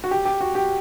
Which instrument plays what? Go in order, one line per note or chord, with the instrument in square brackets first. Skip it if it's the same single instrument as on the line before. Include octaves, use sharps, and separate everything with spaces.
[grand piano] F#4
G4
G4
F#4
G4